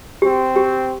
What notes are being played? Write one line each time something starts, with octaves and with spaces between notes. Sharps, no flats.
C4 G4
G4